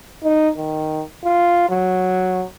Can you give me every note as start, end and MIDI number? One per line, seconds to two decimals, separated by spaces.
0.24 0.49 63
0.57 1.02 51
1.24 1.66 65
1.69 2.44 54